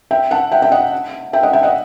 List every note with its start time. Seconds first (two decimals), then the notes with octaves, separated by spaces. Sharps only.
0.11 E5 G5
0.31 F#5 A5
0.52 E5 G5
0.62 E5 G5
0.71 D#5 F#5
1.33 E5 G5
1.43 D#5 F#5
1.53 E5 G5
1.63 D#5 F#5